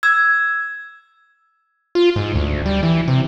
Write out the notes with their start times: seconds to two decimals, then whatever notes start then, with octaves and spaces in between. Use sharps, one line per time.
0.03 E6 G#6
1.95 F4
2.16 G#2
2.35 D2
2.66 G3
2.83 E3
3.08 C3